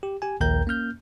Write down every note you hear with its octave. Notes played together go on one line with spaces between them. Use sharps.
G4
G4 G#5
A#1 D#2 A#4 G5 A#5 G6
A#3 C#4 F6 G6